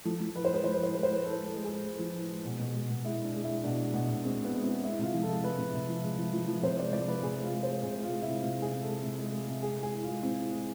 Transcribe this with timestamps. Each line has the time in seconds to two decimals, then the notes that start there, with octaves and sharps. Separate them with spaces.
0.05 F3 A4
0.20 F3
0.34 A2 B4
0.45 C5
0.50 G#3 B4
0.64 F3 C5
0.74 B4
0.80 A2 C5
0.94 G#3 B4
1.03 C5
1.10 G#3 B4
1.24 A2 A4
1.39 G#3
1.45 A4
1.54 G#3
1.65 G#3 G#4
1.84 G#3
1.99 F3
2.14 A2
2.29 G#3
2.45 B2
2.59 B2
2.74 G#3
2.90 B2
3.04 G#3 E4
3.20 G#3 D4
3.35 G#3
3.44 E4
3.49 G#3
3.64 B2 D4
3.79 G#3
3.94 B2
4.09 B2
4.24 G#3 C4
4.39 G#3
4.44 B3
4.54 G#3
4.63 C4
4.68 G#3
4.83 G#3 E4
4.99 C3 F4
5.14 F3
5.23 A4
5.29 G#3
5.44 G#3 B4
5.58 C3
5.74 C3
5.89 F3
6.03 G#3
6.18 F3
6.33 F3
6.48 F3
6.63 C3 C5
6.78 G#3 D5
6.93 F3 D5
7.08 G#3 B4
7.23 C3 G#4
7.39 G#3 F4
7.53 G#3
7.63 G#3 C5
7.83 C3 G#4
7.97 G#3
8.03 F4
8.13 G#3
8.22 E4
8.28 C3
8.42 C3 F4
8.57 G#3 G#4
8.73 C3
8.83 G#3 A4
9.03 C3
9.18 G#3
9.33 G#3
9.48 C3
9.63 G#3 G#4
9.78 G#3 G#4
9.93 A2
10.03 F4
10.08 G#3
10.23 A2 C4
10.37 A2
10.52 G#3